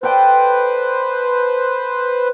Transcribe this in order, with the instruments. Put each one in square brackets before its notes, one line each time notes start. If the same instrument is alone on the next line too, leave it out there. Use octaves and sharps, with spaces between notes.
[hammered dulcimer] A4 D5 G5 [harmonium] B4 C5